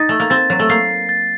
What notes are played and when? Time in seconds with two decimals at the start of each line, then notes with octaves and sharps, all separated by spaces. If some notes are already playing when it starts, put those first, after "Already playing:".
Already playing: D#4 A6
0.09 A3
0.20 A#3
0.30 C4 A6
0.50 F#3
0.59 A3
0.69 A#3 C7
1.09 A6